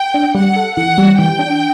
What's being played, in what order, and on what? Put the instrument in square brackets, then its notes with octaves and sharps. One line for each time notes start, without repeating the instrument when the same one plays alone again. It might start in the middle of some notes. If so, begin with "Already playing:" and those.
Already playing: [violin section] G5
[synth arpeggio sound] D4
[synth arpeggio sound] G3 [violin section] F#5
[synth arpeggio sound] A4
[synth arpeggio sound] E3 [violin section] F#5
[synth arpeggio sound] G3
[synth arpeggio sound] E3 [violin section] G5
[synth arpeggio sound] D4